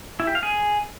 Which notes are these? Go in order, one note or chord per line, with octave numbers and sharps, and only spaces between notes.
E4
G4
F5
G#4